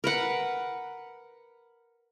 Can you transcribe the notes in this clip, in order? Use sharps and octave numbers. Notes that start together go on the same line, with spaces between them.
A#4 B4 F#5